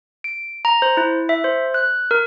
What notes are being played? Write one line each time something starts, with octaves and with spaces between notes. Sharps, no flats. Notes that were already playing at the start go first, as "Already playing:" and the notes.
D7
A#5
C5
E4
E5
C5
F#6
A#4